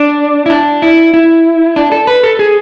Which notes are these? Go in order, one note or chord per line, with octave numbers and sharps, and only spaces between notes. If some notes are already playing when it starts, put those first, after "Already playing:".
Already playing: D4
E4
D4
E4
E4
D4
A4
B4
A4
G#4